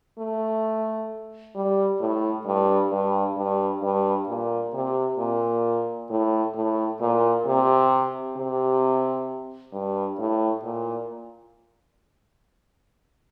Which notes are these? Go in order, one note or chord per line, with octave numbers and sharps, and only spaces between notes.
A3
G3
A2
G2
G2
G2
G2
A#2
C3
A#2
A2
A2
A#2
C3
C3
G2
A2
A#2